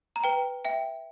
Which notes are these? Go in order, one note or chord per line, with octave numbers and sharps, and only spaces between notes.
A#5
B4 G5
E5 G5